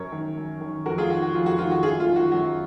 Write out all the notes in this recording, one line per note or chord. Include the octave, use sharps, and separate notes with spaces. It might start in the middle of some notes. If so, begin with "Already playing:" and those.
Already playing: F#2 A#4 C#5
D#3
F#2
D#3
F2 F#4 A#4
F4 G#4
D#3 F#4
F#4
F2 F4
F#4
D#3 F4
F#4
F#2 F4 G#4
F4
D#3
F#4
F#2 F#4